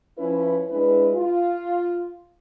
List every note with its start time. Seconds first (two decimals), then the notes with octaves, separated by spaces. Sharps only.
0.19 F3 C#4 E4 B4
0.70 G#3 D4 E4 B4
1.15 F4